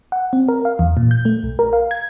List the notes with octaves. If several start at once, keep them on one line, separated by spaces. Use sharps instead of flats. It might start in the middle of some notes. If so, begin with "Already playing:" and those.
F#5
C4
A#4
F5
E2
A#2
G6
A3
B1
A#4
F5
G#6